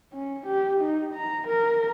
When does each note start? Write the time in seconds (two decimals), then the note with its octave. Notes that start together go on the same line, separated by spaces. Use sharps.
0.13 C#4
0.46 G4
0.81 D#4
1.14 A#5
1.48 A#4